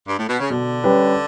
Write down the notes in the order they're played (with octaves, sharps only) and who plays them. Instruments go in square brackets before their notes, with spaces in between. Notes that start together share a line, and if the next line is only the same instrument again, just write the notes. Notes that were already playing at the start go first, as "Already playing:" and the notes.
[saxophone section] G2
A2
B2
C#3
[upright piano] B2 [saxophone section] D3
[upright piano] G3 C#4 G4 B4